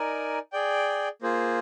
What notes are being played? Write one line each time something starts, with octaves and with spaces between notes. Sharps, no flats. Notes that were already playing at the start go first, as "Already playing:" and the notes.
Already playing: D#4 A#4 D5 G#5
G#4 D5 G5
A#3 F4 G#4 C5